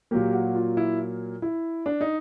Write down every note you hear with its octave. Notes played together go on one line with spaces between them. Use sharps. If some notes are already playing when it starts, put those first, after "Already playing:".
A#2 F#3 A#3 G4
F#4
F4
E4
E4
D4
D#4